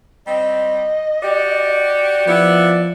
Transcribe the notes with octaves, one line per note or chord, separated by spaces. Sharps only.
G3 C4 D#5
F#4 G4 D5
F3 B3 E4